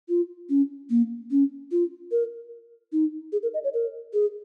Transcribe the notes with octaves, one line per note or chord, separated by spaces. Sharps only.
F4
C#4
A#3
C#4
F4
A#4
D#4
G#4
A#4
D#5
C#5
A#4
G#4